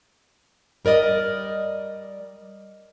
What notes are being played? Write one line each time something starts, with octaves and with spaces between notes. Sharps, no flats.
G3 A#4 D5 D#5